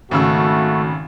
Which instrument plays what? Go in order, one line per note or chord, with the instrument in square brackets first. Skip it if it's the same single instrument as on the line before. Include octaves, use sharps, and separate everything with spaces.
[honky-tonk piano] G#1 C#3 E6 [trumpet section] A3 F#4